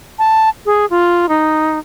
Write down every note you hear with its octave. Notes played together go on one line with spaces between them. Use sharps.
A5
G#4
F4
D#4